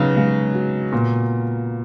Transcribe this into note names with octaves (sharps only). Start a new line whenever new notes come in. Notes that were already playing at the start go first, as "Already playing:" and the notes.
Already playing: C#3 F#3 B3 D#4 B4
C#3 G#3
F#4
A#2 B3